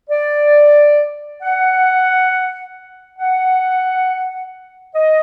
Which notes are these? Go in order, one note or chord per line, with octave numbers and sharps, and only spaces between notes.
D5
F#5
F#5
D#5